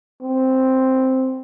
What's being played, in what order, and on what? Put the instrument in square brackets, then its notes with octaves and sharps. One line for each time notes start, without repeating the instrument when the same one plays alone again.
[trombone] C4